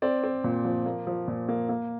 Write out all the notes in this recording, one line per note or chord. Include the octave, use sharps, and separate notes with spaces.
C4 D5
C4
A#2
F3
A#3
F3
A#2
A#3
A#3